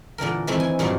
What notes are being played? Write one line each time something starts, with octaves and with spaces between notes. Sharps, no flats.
A#2 D3 E3 A#4
D#3 E3 A3 C4
G#5
G2 A#2 D#3 F#3